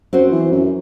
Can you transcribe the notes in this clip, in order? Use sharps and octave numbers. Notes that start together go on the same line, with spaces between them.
F#2 C4 F#4 C5
E3
F#2